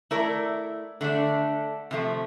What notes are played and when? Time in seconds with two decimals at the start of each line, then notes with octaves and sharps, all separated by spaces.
0.11 A3 E4 A#4 D5
1.01 D3 A3 D4
1.91 C3 F3 A3